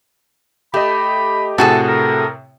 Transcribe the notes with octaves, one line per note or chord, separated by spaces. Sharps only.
A3 G4 D#5 B5
A2 C3 F#4 G#4 A4 A5
A#4